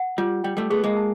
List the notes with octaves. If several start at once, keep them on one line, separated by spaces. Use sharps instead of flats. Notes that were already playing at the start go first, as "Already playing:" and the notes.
Already playing: F#5
G3 F4
G3 G5
G3 A3
A3 B3 G#4
G#3 A#3
A5